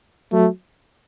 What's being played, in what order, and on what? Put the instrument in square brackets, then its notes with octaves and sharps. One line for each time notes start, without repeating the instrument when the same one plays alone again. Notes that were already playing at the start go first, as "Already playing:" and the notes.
[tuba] F#3 [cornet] A3